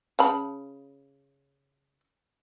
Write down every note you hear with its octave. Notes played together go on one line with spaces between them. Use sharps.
C#3 A5 B5